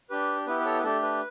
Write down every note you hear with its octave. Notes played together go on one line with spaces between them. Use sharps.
D4 G4 B4
B3 E4 G4 B4
B4
A4 C#5
B4
A3 D4 G4 A4
B4